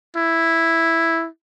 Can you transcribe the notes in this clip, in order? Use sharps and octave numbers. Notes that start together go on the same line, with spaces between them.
E4